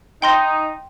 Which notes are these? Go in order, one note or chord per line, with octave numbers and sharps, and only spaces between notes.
D#4 G5 C6 A#6